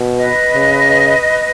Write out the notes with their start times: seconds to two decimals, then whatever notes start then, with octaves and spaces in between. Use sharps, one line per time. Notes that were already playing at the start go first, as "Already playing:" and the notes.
Already playing: B2
0.13 B4 D#5
0.55 C#3